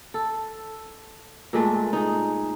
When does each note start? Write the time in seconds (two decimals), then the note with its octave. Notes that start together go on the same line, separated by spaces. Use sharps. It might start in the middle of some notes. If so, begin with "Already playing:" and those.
0.14 A4
1.53 A#2 G#3 A3
1.93 D#4 G#4